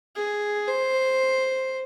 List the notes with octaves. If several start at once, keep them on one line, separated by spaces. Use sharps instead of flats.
G#4
C5